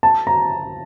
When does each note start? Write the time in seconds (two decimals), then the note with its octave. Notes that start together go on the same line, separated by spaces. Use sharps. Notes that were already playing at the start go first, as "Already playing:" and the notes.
0.03 A5
0.27 A#5